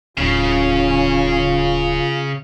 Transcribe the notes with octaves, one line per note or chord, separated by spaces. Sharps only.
D1 C#3 C#4 F4